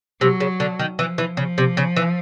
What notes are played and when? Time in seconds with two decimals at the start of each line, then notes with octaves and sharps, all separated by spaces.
0.21 C3 F#3
0.40 C#3
0.60 D3
0.79 D#3
0.99 E3 F3
1.18 E3
1.37 C#3 F3
1.58 C3
1.77 C#3
1.96 E3